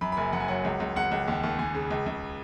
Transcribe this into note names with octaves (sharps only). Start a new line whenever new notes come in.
F#2 B5
B5
F#1 G#5
F#2 F#5
G#5
F#3 F#5
C#2
C#2
C#2 F#5
C#2
D#2
D#2
D#2 G#5
C#3
C#2
C#2